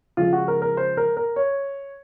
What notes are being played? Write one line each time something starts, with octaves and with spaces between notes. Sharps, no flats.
C#3 F3 G#3 F4
F#4
A#4
A#4
C5
A#4
A#4
C#5